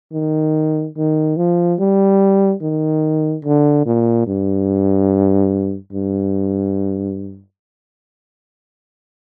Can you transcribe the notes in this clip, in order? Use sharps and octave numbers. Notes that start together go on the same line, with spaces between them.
D#3
D#3
F3
G3
D#3
D3
A#2
G2
G2